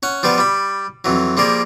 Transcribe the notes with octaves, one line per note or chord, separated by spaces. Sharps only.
C#4 F#5
F3 G3 B3 B4
G3 B5
F2 E3 F#3
F3 G3 A#3 G#4